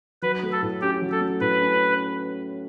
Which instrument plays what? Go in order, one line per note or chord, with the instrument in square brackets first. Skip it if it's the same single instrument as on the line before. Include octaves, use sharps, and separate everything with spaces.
[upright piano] F#3 [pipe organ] B4
[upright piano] A3
[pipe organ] A4
[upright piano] A2
[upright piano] C#4 [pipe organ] G4
[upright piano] F#3
[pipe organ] A4
[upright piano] A3
[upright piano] A2 [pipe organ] B4
[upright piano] C#4